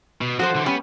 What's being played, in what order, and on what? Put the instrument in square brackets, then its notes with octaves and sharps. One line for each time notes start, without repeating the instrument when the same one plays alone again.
[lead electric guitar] B2
[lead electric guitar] F3 [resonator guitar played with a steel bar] F#4 A4 C5
[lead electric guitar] D3 E3
[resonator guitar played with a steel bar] G3 C#4 G4 [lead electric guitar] B3